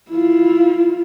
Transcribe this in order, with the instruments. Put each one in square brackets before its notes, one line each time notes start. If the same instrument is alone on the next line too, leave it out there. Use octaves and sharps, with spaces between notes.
[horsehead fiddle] E4 F4